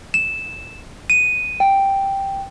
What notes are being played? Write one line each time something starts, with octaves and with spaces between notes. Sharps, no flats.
E7
D#7
G5